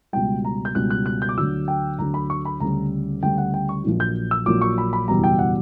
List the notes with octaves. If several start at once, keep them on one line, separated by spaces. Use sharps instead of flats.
C#2 B2 G3 G5
A#5
G6
C#2 B2 G3 F#6
F#6
F#6
G6
D6
D2 D3 F#3 E6
G5
D2 D3 F#3 A#5
B5
C#6
B5
D2 C#3 G3 A#5
D2 C#3 G3 G5
F#5
G5
C#6
A#1 A#2 F#3
G6
E6
A#1 A#2 F#3 D6
C#6
B5
B5
F#1 E2 B2 G3 A#5
G5
F#5